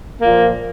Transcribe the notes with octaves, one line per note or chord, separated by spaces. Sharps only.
A#2 F3 A#3